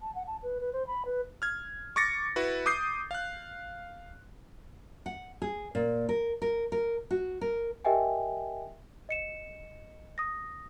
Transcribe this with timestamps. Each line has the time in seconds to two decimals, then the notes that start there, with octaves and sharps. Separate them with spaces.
0.01 A5
0.15 F#5
0.27 A5
0.43 B4
0.61 B4
0.73 C5
0.87 B5
1.06 B4
1.42 F6 G#6
1.96 C#6 D6 A6 A#6 C#7
2.36 E4 F#4 B4
2.66 D6 D#6 G6 C7
3.11 F5 F#6
5.06 F#5
5.42 G#4
5.75 A#2
6.09 A#4
6.42 A#4
6.72 A#4
7.11 F#4
7.41 A#4
7.85 G4 A#4 D#5 E5 G5 G#5
9.09 D#5 C#7 E7
10.18 D#6 A#6